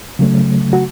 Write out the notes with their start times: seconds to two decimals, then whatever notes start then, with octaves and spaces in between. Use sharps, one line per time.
0.19 C#3 F#3 A3
0.73 F#4